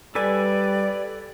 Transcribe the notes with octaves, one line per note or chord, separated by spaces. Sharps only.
G3 A4 B4 D5 G#5